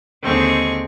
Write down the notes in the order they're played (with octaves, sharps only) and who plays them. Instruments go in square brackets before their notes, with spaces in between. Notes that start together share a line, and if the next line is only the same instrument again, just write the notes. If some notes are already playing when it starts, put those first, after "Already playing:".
[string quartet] D#2 D3 G#3 C4 G#4 C#6